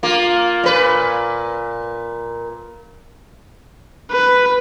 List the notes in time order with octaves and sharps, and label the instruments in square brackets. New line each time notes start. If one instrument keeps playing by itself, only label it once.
[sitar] A#3 F4
A#2 B4
[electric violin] B4